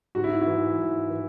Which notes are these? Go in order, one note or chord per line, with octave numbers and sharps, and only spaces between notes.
G#2 F#4
E4
E4
E3
G#2
E3